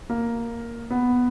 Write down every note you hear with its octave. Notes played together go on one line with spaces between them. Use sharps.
A#3
B3